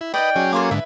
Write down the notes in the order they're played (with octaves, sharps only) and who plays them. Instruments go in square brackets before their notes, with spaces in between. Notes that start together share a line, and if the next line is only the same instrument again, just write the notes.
[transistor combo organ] E4
[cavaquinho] D#4 A#4 D5 [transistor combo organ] B4 D#5 [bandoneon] G5
[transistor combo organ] F#3 C#4 G#4
[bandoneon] A#3 [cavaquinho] A4 C6 D6
[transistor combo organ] G#2 D3 [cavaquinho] E4 B4 E5